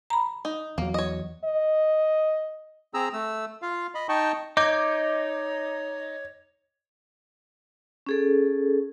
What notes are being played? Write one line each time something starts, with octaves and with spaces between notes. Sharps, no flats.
A#5 B5
D#4
E2 F#3 A#3
C#5 D#5
D#5
C4 G#4 A#5 E6
A3 E6
F4 F5
D#5 B5
D#4 D#5 G5 A5 C#6
D#4 C#5 D#5 D6 G6
C#4 G#4 A4